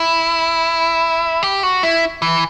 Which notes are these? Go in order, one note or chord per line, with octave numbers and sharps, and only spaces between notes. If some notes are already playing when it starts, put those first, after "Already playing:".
Already playing: E4
G4
F#4
E4
E3